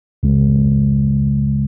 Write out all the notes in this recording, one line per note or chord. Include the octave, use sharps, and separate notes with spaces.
C#2 C#3 G#3